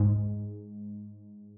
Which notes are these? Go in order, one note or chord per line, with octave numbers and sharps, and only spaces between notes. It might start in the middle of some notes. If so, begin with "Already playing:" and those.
Already playing: G#2